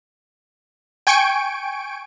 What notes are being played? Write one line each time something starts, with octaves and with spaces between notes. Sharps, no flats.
G5 G#5 C#6 D7